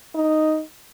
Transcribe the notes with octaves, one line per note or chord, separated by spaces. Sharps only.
D#4